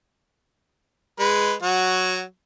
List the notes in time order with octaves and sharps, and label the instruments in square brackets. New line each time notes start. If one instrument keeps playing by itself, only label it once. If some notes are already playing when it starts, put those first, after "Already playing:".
[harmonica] G#3 B4
F#3 F#4